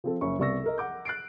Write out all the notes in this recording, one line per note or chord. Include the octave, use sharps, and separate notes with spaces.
F3 C4 A4
F#1 C#4 E5 C#6
C2 B3 D5 C#6 E6 A#6
A4 A#4 D#5
F#5 D6 G6
F#6 A6 C7 D7